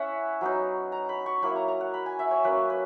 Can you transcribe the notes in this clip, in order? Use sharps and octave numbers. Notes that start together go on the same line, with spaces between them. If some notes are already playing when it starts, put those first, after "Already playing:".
Already playing: C#4 E4 E5 F#5
F#3 B3 D#4
A#5
B5
C#6
F#3 A#3 E4 B5
A#5
A#5
F#5
B5
G#5
E5
C#5
F#3 A#3 C#4 B4
B4